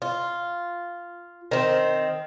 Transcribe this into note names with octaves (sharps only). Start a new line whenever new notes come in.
F4
D#3 C4